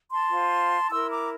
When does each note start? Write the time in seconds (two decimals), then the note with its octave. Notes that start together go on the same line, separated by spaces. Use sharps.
0.11 A5 C6
0.31 F4 C5
0.90 E4 A#4 C6 E6
1.09 A#5 D6